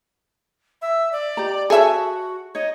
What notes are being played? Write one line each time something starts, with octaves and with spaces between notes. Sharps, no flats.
E5
D5
G4 D#5 A#5
F#4 G#4 A4 C#5 E5 A5
D#4 C#5 D#5